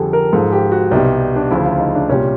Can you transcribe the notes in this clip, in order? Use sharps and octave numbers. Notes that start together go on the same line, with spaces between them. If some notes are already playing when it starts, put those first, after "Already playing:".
Already playing: F2 D3 G3 G#4 A4
A#4
G#2 F3 A4
G4
F#4
C2 B2 G3 D#4
D4
D2 C#3 F3 E4
F4
D#4
D4
C2 A#2 G3 C#4